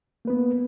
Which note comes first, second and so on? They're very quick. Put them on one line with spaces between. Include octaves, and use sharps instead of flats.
A#3 B4 B3